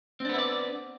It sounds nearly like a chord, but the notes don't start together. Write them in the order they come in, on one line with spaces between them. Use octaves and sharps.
C4 D4 B3 E4 D5